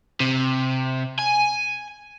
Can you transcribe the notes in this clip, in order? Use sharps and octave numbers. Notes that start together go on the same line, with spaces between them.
C3
G#5